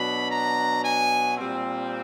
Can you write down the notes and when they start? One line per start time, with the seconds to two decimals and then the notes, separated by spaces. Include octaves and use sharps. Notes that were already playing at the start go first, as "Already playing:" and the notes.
Already playing: B2 F#3 B3 D4 B5
0.30 A#5
0.84 G#5
1.38 A#2 G3 C4